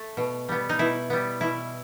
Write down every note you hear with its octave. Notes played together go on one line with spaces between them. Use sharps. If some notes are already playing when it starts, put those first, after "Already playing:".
Already playing: A3
B2
G3 B3
D#4
B2 E4
G3 B3
B2 E4